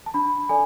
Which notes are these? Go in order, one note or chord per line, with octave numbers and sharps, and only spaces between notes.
A5
D4 B5
A4 D5 G#5